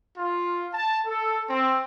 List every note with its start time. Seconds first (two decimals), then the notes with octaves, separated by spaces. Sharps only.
0.18 F4
0.74 A5
1.06 A4
1.50 C4